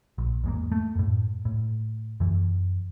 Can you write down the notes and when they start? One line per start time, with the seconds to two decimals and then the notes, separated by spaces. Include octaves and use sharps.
0.18 A#1
0.44 E2 G#2 A#3
0.72 A3
0.95 F#2 A2
1.45 A2
2.20 F#2 E3